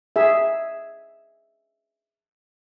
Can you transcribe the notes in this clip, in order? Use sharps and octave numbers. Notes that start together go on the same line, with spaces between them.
G#4 E5